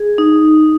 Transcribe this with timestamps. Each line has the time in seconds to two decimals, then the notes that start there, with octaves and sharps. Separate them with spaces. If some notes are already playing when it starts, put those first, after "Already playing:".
Already playing: G#4
0.18 D#4